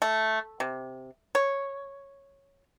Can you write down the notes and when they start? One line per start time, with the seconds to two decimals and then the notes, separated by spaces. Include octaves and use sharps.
0.02 A3
0.60 C3
1.35 C#5